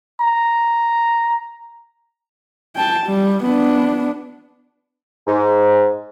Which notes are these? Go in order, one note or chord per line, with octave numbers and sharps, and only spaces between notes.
A#5
G5 A5
G3
B3 D4
G#2